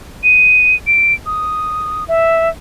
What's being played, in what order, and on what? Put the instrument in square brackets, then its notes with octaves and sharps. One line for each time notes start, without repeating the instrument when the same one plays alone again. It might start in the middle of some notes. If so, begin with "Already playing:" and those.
[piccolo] D#7
D7
D#6
E5